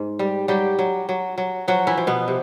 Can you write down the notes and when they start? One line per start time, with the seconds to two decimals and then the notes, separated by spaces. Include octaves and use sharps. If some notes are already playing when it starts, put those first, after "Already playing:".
Already playing: G#2
0.19 G3
0.48 F#3 G3 G4
0.79 F#3
1.09 F#3
1.38 F#3
1.68 F3 F#3 F#4
1.87 E3 E4
1.98 F3
2.07 B2 B3
2.28 C3